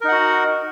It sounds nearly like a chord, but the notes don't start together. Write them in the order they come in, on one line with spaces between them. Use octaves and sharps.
A#4 D#4 F#5 F#4